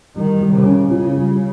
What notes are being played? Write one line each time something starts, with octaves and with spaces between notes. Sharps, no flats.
D#3 G3
G3
C#3
C#4
C#3 F4
G3